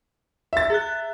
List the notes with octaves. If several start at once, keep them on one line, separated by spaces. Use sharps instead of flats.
E5 A6
G#4 F#6